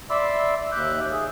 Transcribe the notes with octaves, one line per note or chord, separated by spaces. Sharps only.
D5 E5 B5 C6 D6 E6
D#2 E5 D6 F#6 G6
G#4